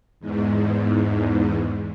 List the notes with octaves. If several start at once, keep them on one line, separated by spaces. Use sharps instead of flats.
E2 G#2